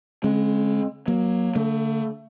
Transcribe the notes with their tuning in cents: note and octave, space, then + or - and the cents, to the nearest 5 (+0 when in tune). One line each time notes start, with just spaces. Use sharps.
D3 -45 G#3 +15 C#4 -45
F#3 +0 A#3 +25
D3 -25 A3 +30